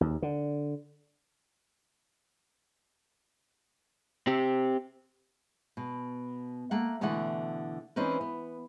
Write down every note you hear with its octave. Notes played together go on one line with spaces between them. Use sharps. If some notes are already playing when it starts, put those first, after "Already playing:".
D#2
D3
C4 G4
B2
A3 A#3 F#5
B2 D3 E3 A3 F#5
E3 C4 C#4 D#4 B4
B3